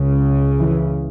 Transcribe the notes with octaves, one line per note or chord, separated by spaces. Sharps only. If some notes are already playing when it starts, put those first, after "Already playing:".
Already playing: C#2 C#3
E3